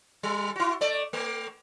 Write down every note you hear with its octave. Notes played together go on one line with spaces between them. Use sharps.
G3
E4 F#4
A3 D5
A3